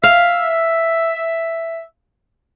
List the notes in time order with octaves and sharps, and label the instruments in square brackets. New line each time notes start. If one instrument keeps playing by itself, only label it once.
[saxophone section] E5 [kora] F5